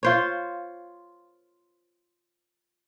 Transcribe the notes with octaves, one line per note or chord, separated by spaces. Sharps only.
F4 C5 C#5